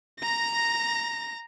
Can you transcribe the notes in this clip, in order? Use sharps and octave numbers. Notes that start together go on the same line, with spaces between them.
A#5 A#6